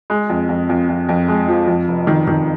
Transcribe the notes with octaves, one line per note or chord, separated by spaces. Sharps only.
G#3
F2
F2
F2
F2
F2
G#3
F3
F2
F1
D#3
D#3